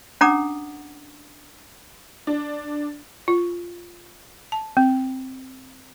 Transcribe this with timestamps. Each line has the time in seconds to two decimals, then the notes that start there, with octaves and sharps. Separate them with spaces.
0.21 C#4 D4 F#5 A#5 D6 D#6
2.27 D4
3.28 F4
4.52 A5
4.77 C4